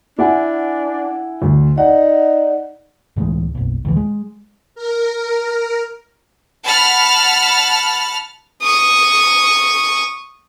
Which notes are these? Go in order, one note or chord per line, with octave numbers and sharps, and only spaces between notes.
D4 E4 F#5 G#5
D2
D#4 D5 F#5
C#2 A2 E3 G#3
F#1 B1
D2 A2 E3
G#3
A#4
F#5 A5 B5 F6 A6
C#6 D#6